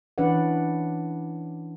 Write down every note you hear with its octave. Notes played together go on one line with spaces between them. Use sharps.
E3 C#4 D4 B4 D5 F#5